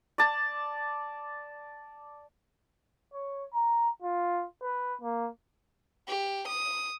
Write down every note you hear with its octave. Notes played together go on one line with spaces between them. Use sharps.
D5 A5
C#5
A#5
F4
B4
A#3
G4
D#6